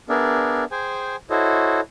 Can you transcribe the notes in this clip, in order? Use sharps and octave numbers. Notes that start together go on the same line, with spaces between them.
B3 D4 G#4 A#4 D5 E5
G#4 C5 G5 G#5
E4 F#4 A4 C5 C#5 D#5